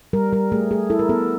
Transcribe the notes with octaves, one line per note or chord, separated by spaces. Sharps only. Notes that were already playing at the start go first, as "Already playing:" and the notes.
G3 A#4
G3 A#4
A3 G#4
A3 G#4
E4 A4
A#4
B3 A4